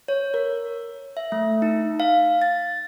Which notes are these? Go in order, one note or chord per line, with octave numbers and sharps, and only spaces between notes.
C#5
A#4
E5
A3
D#4
F5
A6